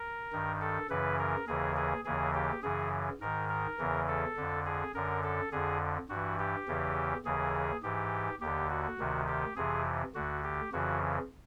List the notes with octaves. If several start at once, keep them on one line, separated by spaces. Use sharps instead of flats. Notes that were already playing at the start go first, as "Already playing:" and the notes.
Already playing: A#4
G2 D#3
A4
F#2 C#3 E3 B4
A#4
D#2 C#3 E3 G#4
G#4
D#2 C#3 E3 G#4
G4
F#2 C#3 E3 G#4
G#2 D#3 A#4
A#4
E2 C#3 E3
A4
F2 D3
G#4
F#2 D3 A#4
A4
F2 D3 G#4
G2 E3 F#4
G4
E2 C#3 E3
D#2 C#3 E3 G#4
G#2 E3 G4
D#2 D3 G4
F#4
D2 C3 D#3
G4
F2 C3 E3 G#4
D2 D3 F#4
G4
F2 C#3 E3 F#4